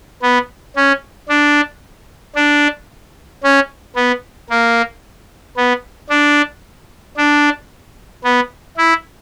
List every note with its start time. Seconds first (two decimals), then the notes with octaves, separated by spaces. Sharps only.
0.22 B3
0.76 C#4
1.29 D4
2.36 D4
3.44 C#4
3.96 B3
4.50 A#3
5.57 B3
6.10 D4
7.17 D4
8.24 B3
8.77 E4